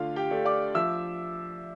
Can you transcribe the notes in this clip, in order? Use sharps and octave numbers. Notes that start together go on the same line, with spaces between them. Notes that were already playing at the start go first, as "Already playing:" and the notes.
Already playing: D3 A3 D4 F4 F5
G4 G5
A3 D4
D5 D6
F3 E5 E6